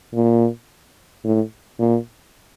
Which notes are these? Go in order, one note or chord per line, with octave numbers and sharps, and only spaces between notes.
A#2
A2
A#2